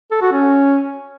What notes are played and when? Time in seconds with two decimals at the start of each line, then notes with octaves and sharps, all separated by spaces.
0.11 A4
0.22 F#4
0.32 C#4